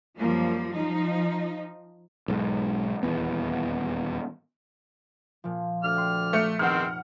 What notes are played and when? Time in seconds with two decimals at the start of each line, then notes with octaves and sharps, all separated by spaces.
0.17 F#2 F3 G3 A#3
0.72 F3 D#4
2.28 B1 G#2
3.03 D#1 E2 B3
5.44 A#2 F3
5.83 D2 D5 F6
5.96 G5 C6
6.33 A3 C#7
6.59 F1 E2 D#3 C4 F#5 F6